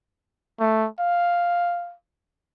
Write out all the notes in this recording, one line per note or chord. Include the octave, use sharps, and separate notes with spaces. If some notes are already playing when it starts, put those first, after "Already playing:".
A3
F5